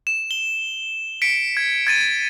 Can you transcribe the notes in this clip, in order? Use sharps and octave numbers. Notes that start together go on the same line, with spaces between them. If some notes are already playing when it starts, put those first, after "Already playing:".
E7
G7
B6 C#7 D7
G#6
G#6 A6 D#7